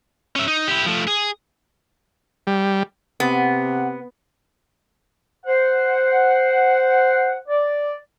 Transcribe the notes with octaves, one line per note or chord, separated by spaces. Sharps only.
C#4 E5
D#4
E4 G4
F3 A3
G#4
G3
C3 B3 F#5
C5 F#5
D5